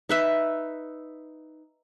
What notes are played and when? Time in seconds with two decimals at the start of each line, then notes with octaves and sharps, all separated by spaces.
0.09 D#4 B4 E5